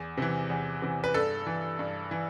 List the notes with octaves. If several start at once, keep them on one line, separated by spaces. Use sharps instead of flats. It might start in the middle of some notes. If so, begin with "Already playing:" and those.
Already playing: E2
C3 E3
E2
C3 E3
B4
G2 A4
E3
G2
E3